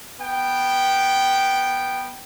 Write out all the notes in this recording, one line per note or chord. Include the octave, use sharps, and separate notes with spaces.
B3 G5